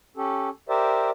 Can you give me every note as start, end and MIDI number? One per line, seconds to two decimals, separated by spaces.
0.17 0.49 61
0.17 0.49 67
0.17 0.49 69
0.69 1.10 67
0.69 1.10 70
0.69 1.10 72
0.69 1.10 74
0.69 1.10 76